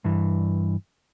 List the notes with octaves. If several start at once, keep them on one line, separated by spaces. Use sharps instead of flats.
G2 E3